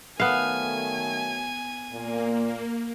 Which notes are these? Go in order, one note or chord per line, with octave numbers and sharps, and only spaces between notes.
D#3 F#3 A3 B3 F5 G#5
A#2 A#3